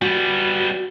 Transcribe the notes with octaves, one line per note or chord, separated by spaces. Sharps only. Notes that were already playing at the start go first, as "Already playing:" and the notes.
G3 B3 F#4